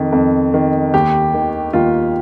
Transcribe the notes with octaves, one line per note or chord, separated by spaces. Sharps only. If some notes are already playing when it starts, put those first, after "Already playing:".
Already playing: F2 D#3
F2
D#3
D#2 G4
D#3
D#2 F4